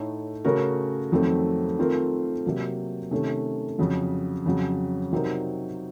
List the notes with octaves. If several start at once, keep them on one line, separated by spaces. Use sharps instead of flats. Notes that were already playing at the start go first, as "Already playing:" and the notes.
Already playing: A2 A3 D#4 A4 C#5
C#3 A3 C#4 F#4 A#4
F2 D#3 F#3 A3 C4
D#3 A3 C4 F4 A#4
C3 F#3 A#3
C3 D#3 A3 C#4
F2 C#3 F#3
F2 C#3 F#3
C3 F#3 C4 D#4 A#4